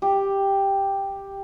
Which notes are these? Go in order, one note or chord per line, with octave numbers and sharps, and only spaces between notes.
G4